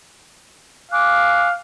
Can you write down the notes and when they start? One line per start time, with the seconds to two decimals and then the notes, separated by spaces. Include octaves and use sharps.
0.91 F5 G#5 D6 F#6